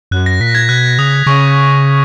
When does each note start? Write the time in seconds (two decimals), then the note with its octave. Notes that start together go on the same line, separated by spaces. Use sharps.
0.11 F#2 F#6
0.26 A#6
0.40 A#2 B6
0.55 G#6
0.69 B2 F#6
0.98 C#3 D#6
1.26 C#3 C#6